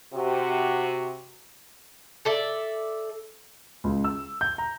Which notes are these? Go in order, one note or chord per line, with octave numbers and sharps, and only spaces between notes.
C3 F#4
A4 D5 E5
C#2
E6
G6
A#5